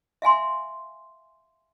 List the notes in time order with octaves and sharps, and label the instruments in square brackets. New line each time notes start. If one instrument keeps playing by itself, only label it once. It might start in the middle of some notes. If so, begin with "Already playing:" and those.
[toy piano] E5 F5 G#5 C6